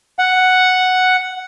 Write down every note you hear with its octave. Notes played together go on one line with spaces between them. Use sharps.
F#5